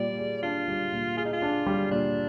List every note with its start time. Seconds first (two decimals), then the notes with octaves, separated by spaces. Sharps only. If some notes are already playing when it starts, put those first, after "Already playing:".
Already playing: A#2 G3 D5
0.18 G#4
0.43 D4 F4
0.68 G3
0.92 A#2
1.17 F4 G#4
1.25 D#4
1.33 F4
1.42 D4
1.66 G3
1.91 A#2 D4